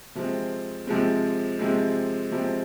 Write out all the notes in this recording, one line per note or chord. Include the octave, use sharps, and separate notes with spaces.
C3 F3 G#3 C4
C3 F3 G#3 C4
C3 F3 G#3 C4
C3 F3 G#3 C4